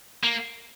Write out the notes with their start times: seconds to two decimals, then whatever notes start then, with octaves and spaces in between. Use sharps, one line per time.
0.23 A#3